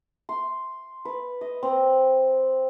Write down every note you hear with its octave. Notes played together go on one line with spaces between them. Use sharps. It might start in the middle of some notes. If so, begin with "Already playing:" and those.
C6
B4
D#5
C4